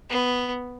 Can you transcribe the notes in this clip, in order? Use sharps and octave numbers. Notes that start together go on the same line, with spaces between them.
B3